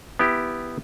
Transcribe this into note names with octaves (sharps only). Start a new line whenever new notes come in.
B3 E4 G4